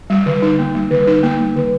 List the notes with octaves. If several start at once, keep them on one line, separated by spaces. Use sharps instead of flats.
G3
D3
D#4
A#3
G3
D3
D#4
A#3
G3
D3